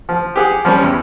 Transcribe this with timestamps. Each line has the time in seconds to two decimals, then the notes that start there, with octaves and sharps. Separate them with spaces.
0.09 F3
0.36 G4 G#4 F#5
0.65 F3 G3 C#4
0.83 E2